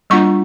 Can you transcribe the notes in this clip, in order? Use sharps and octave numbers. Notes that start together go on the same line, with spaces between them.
G3 A#3 D4 F4 C#6